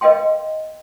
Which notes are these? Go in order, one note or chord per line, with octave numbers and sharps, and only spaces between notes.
B4 D#5 F5 G5 C6